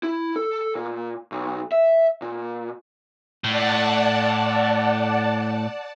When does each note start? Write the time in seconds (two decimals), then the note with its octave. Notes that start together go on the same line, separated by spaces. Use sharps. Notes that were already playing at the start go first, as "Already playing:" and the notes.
0.03 E4
0.36 A4
0.75 A#2
1.32 B1
1.72 E5
2.22 A#2
3.44 A2 D5 F#5 A5